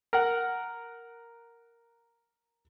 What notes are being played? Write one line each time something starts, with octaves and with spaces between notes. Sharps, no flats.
A#4 F#5